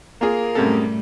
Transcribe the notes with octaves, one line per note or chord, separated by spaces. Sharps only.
A#3 F4 G#4 A#4
F#2 A2 C3 G3 A3 A4